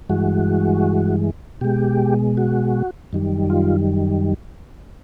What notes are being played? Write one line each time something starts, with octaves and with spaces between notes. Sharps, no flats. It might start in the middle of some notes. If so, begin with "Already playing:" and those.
G2 E3 G#3 F#4
B2 G#3 G4
F#4
F#2 D#3 G3
F4